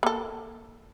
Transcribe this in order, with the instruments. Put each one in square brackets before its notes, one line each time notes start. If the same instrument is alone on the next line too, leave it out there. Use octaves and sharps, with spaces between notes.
[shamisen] A#3 A4